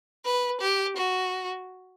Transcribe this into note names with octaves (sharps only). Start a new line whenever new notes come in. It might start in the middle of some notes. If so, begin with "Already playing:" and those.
B4
G4
F#4